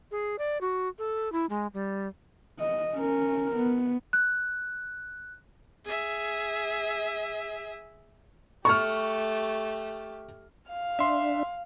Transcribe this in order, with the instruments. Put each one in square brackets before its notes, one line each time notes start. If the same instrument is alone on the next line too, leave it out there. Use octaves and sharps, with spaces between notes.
[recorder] G#4
D5
F#4
A4
E4
G#3
G3
[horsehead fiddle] D#5
C#4 A#4
B3
[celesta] F#6
[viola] G#4 E5
[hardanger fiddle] A3 G4 [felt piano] C#6 F6
[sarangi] F5
[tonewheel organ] D4 [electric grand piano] E5 C6